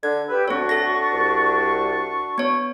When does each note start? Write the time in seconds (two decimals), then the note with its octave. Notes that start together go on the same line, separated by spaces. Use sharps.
0.03 D3 G#6
0.29 G4 B4 E6
0.48 D2 C4 D4 F#4 C#5 C#6
0.69 A4 A#6
1.13 C2
2.38 B3 C#5